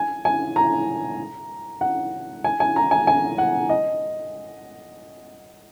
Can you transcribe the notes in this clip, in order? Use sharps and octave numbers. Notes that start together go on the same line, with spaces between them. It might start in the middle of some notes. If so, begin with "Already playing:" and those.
Already playing: G#5
G#5
A#5
F#5
G#5
G#5
A#5
G#5
G#5
F#5
D#5